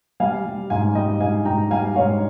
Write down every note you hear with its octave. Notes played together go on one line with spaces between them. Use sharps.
G3 F5 G#5
G3
G#2 F5 G#5
G3 D#5 G5
G#2 F5 G#5
G#2 G5 A#5
G3 F5 G#5
G#2 C#5 F5